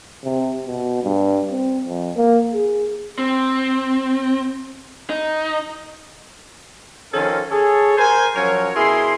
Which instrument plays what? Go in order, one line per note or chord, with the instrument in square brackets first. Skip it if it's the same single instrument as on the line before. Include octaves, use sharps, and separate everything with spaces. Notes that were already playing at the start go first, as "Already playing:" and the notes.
[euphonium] C3
B2
G2
C4
F2
A#3
G#4
[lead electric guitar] C4
D#4
[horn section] D#3 F3 C#4 A4 A#4 C5
G#4 A4 C#5
A#4 C5 G#5
F3 F#3 C#4 A#4 C#5
B2 E4 G#4 A#4 C6